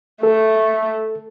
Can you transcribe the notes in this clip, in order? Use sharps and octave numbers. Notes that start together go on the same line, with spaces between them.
A3 A4